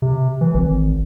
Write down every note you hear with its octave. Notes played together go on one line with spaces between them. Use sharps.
C3
E3
G#1